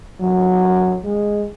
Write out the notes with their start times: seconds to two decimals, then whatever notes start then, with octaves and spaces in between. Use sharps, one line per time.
0.19 F#3
1.04 G#3